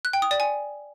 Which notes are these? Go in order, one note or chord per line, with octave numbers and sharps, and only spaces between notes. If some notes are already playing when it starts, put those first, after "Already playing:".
F#6
G5
D#6
D5
G#5